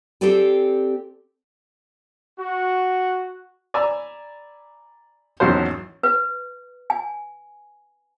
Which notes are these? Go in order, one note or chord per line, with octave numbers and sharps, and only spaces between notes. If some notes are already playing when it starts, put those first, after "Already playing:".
C4 G4 A4 C5 D5 G#5
F#4
D5 G#5 A#5 B5 E6
G#1 E2 F#3 C#4 C5
B4
G#5